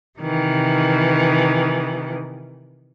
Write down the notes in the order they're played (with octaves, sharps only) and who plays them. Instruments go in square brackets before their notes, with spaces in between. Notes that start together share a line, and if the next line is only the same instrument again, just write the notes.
[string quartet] C3 D#3 E3